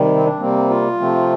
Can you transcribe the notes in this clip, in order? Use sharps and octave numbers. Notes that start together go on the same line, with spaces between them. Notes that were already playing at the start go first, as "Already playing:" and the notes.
Already playing: C3 D#3 G3
C4
D4
C3 G3 A#3 C4
F4
C3 F3 A3 C4